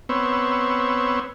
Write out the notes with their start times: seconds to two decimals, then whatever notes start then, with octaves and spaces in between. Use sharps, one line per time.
0.09 B3 C4 C#5 E6